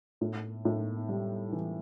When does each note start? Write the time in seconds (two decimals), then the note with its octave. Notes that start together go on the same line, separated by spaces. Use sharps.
0.21 A2
0.65 A2
1.09 G3
1.52 E3